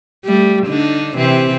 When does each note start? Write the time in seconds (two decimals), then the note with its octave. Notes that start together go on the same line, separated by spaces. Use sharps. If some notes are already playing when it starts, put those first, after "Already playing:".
0.25 G3 A3
0.67 D3 D4 D#4
1.17 C3 E3 C4